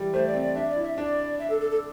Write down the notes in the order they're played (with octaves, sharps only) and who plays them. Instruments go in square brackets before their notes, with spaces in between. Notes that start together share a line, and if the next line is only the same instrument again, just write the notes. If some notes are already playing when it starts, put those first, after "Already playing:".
Already playing: [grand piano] E3 G3
[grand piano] A3 [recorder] C5
[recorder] D5
[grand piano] C4
[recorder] D5
[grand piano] D4 [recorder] E5
[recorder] D5
[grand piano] E4
[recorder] E5
[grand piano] D4 [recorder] D5
[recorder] E5
A4
A4
A4